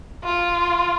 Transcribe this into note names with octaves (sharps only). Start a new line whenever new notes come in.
F4